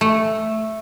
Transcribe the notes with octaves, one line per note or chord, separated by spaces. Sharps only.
A3